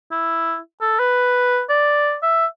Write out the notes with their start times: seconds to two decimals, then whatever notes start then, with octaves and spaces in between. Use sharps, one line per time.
0.11 E4
0.81 A4
0.99 B4
1.69 D5
2.22 E5